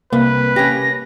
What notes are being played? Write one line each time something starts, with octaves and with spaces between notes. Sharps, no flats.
C2 A#3 B4
C#4 G4 A#6